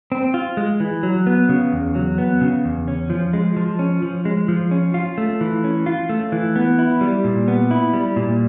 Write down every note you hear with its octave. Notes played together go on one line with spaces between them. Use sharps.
C4
F4
G#3
E3
F#3
B3
C#3
E2
F#3
B3
C#3
E2
C#4
F3
G#3
F3
C#4
F3
G#3
F3
C#4
F4
A3
E3
C#4
F4
A3
E3
B3
E4
G3
A#2
B3
E4
G3
A#2